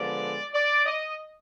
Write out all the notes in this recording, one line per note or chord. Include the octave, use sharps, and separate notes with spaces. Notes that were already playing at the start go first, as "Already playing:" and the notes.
Already playing: D3 F3 G#3 B3 D5
D5
D#5